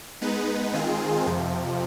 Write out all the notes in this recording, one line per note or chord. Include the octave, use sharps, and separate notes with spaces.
G#3 B3 D#4 B4
D#3 G#3 C4 F4 G#4
F2 C3 F3